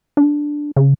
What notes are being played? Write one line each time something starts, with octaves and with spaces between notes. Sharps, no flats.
D4
C#3